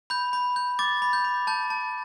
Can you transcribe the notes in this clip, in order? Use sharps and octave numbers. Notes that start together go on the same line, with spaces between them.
B5 G6
B5
G6
D6 A6
B5
G6
B5
A5 G6
A5